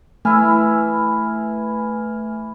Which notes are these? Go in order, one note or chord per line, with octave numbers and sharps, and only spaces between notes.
E3 A3 E4 G#5 F6